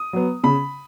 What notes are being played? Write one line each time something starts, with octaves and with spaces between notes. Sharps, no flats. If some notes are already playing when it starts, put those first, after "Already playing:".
Already playing: D#6
F#3 B3
C#3 B5